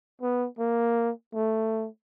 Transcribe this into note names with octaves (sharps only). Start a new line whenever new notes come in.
B3
A#3
A3